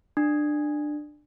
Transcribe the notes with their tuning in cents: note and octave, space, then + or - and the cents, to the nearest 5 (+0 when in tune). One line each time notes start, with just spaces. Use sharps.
D4 +20